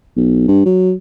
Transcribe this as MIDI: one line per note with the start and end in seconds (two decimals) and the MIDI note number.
0.17 0.44 35
0.48 0.63 43
0.65 0.93 54